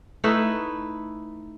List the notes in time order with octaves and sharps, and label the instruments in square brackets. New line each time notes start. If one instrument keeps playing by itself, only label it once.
[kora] A3 D#4 E4 B4